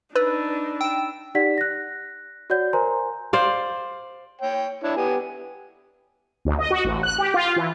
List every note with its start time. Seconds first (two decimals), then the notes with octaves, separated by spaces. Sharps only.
0.16 D4 D#4 B4 B5 E6 A6
0.81 G5 E6 E7
1.35 D#4 G4 D5 F#5 B6
1.58 F#6 A#6
2.50 F#4 C#5 D5 F#5 G6
2.73 A#4 C5 G#5 A#5 C6
3.33 C5 D5 F5
4.41 C#5 G5
4.83 D4 E4 C#5
4.96 B3 G4 G#5
6.45 D2
6.59 D#5
6.71 F#4
6.84 A1
7.03 F#6
7.18 G4
7.34 F4
7.56 E3